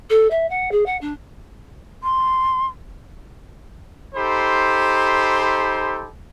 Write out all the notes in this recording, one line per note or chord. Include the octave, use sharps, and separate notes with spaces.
A4
E5
F#5
G#4
F#5
D4
C6
D#4 G4 A4 C5 B5 C6